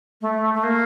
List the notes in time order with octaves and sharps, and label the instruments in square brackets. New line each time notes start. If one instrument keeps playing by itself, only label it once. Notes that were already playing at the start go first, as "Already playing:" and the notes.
[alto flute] A3
A3
A#3